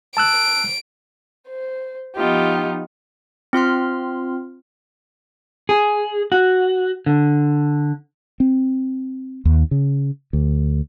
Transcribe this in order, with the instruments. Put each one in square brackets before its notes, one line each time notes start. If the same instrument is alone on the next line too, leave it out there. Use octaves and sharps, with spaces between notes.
[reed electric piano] A5 E6 F#6 [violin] D7
[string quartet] C5
F3 B3 D#4 F4 G4
[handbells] C4 F4 C6 F6
[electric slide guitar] G#4
F#4
D3
[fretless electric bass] C4
D#2
C#3
D2